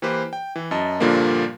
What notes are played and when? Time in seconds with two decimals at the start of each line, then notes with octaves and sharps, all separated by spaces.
0.02 E3 A#3 G4 B4 C5
0.33 G5
0.56 E3
0.71 F#2 D#5 A5
1.00 G2 A#2 D3 F3 G3 A#3